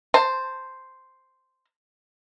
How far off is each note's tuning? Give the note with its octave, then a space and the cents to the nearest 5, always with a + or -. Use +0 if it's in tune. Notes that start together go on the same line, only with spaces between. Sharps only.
C5 +0 A5 +25